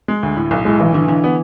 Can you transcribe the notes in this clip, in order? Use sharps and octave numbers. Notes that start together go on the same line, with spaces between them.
G#3
D2
A2
B1
A2 G#3
B1 E3
D3 E3
D3
B3